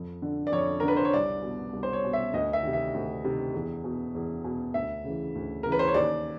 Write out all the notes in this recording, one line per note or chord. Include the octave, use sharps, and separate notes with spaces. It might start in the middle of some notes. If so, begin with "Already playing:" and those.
Already playing: F2
D3
D5
F2 C#5
D3 A#4
B4
C5
C#5
C2 D5
B2
C2
C5
C#5
B2
E5
D2 D#5
E5
C3 D#3
E5
D2
C3 D#3
E2
B2
E2
B2
D2 E5
C#3 E3
D2
C#3 E3 A#4
B4
C5
C#5
D#2 D5